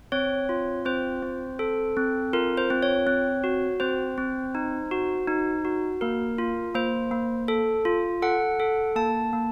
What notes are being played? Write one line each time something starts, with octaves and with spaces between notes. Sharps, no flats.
C4 C#5
F4
C4 C5
C4
A4
C4
F4 A#4
C5
C4
C#5
C4
F#4
C4 C5
C4
D#4
F#4
D#4
F#4
A#3 A#4
F4
A#3 C5
A#3
A4
F4
A4 F#5
A4
A#3 A5
A#3